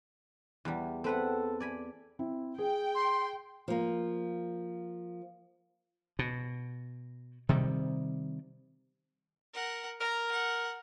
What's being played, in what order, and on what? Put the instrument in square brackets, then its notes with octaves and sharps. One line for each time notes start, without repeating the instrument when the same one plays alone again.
[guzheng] E2 G3
[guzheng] C4 B4 F#5 [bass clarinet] A4
[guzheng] D5 G#5 B5
[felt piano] C4 E4
[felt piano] G#4 [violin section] G5
[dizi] C6
[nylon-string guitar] F3 A#3
[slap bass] B2
C3 D#3 G3
[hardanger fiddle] A#4 F#5
[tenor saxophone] A#4 [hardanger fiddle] A#5
[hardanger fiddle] F#5